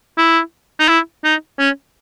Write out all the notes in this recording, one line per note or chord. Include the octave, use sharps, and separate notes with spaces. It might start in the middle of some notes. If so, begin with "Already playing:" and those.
E4
D#4
E4
D#4
C#4